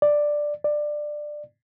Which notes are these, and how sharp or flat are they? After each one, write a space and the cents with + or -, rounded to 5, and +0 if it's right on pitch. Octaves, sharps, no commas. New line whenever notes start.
D5 +5
D5 +15